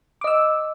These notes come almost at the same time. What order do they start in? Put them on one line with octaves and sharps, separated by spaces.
D6 D#5 E6